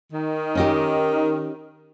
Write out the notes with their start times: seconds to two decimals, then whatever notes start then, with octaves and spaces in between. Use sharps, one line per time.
0.12 D#3
0.55 C#4 D#4 G4